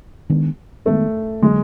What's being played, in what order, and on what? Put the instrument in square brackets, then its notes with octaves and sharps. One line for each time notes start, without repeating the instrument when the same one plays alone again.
[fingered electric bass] D#3 G#3 B3 D4
[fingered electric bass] D#3 G#3 B3 D4 [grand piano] A3
[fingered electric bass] D3 F#3 A#3 [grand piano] G#3